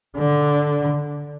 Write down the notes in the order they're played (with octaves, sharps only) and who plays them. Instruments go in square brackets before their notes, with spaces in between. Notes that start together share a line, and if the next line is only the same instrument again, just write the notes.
[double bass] D3